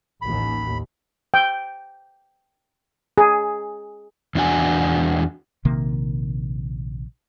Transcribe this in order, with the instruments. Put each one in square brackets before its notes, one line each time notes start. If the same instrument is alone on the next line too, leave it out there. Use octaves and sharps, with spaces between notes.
[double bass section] A1 D#2 [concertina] B5
[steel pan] G5
G#4
[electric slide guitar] E2 D4 F#4 G#5
[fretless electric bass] A#1 C3 D#3 A#3